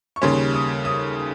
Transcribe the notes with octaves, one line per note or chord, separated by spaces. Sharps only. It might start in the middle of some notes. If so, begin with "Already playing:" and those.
C#6
D#2 C#3 G3 C#4 C6
D#6
D#6